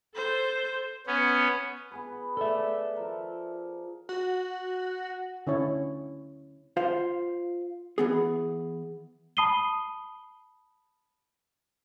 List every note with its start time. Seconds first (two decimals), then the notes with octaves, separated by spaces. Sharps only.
0.15 A4 C5
1.07 B3 C#4
1.91 B3 G#4 B4
2.37 A4 D5 E5
2.96 F3 A#4
4.09 F#4
5.47 D3 C#4 E4 C#5
6.77 F4 C5 F5
7.98 E3 B3 G#4
9.37 A5 B5 D#6 C7 D#7 G7